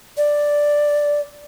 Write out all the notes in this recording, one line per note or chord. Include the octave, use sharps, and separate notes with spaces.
D5